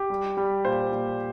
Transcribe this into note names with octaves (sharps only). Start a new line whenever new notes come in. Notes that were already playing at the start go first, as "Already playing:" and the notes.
Already playing: G4
G3
G3
A#2 C5
A#2